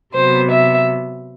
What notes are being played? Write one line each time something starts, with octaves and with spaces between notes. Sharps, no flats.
C3 F#3 B3 C5
E5